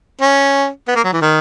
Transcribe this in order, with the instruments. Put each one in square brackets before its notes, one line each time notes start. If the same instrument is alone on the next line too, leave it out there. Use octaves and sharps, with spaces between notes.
[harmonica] C#4
B3
A#3
F#3
E3
D#3